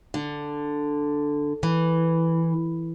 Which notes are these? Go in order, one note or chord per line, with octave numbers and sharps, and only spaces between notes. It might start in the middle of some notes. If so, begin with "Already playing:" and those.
D3
E3